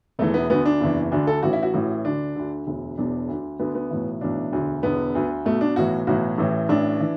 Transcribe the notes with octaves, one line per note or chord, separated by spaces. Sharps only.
E1 E2 E3 A3
B3
D2 D3 B3
D4
F#1 E2 E3
D2 D3 D4
A4
A1 A2 E3 F#4
E4
F#4
A1 A2 E3
D2 D3 D4
D2 D3
E1 D2 D3
E1 E2 B2 D4
D2 D3
D2 D3 B3
B3
B1 A2 E3
B1 A2 E3 D4
E1 D2 D3
E1 E2 D3 B3
D2 D3
B1 B2 A3
D4
B1 A2 E3 F#4
B1 A2 E3 F#4
A1 A2 E3
A1 A2 E3 D4
E3